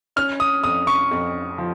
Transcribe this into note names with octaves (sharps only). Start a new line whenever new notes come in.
C#4 F6
D#6
F2 D#6
C#6
F2
F3